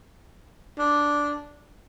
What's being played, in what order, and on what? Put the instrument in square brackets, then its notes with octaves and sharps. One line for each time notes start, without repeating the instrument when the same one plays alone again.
[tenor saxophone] D4